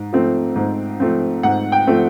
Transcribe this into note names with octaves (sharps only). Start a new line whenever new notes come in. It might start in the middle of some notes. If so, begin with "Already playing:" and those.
Already playing: G#2
F3 A3 C4
G#2
F3 A3 C4
G#2 F#5
G5
F3 A3 C4